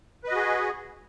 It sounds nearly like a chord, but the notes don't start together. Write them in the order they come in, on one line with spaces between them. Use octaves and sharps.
B4 D#5 F#4 G#4